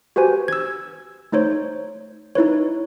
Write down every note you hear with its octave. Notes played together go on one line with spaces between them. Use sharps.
F#4 G4 B4 C5 G#5
E6 G#6
A3 D#4 C5 C#5
D#4 E4 B4 C#5